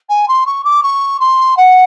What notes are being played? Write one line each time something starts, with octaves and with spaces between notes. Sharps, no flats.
G#5
C6
C#6
D6
C#6
C6
F#5